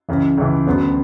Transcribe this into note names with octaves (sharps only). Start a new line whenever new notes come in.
C#2 C#3 E3
C#2 C#3 E3
D2 C#3 F#3 B3